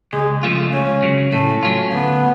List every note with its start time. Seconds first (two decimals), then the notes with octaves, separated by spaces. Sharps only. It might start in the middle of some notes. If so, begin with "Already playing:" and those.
0.13 C#2 G#3
0.43 C#3 F3 A3 F4
0.73 C#2 C#4
1.03 C#3 F#3
1.33 A2 A3
1.63 F#3 C#4 F4
1.92 D2 B3